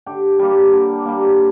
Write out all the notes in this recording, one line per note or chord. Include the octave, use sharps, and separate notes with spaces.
D3 G4
G3 A#3
D3
G3 A#3